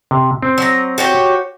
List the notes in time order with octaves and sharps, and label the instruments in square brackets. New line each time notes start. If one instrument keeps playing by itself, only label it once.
[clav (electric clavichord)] C3
C4
[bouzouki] F#3 A#5
F#4 G4 C#5